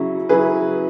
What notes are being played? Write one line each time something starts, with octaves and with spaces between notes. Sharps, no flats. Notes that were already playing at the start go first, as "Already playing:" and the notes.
Already playing: C#3 F#3 C#4 E4
C#3 F#3 C#4 E4 G#4 B4